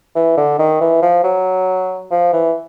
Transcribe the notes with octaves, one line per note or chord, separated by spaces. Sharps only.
E3
D3
D#3
E3
F3
F#3
F3
E3